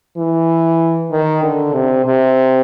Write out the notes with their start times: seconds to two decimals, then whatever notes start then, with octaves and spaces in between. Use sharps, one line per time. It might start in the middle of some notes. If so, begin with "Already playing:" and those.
0.17 E3
1.11 D#3
1.43 D3
1.73 C3
2.05 C3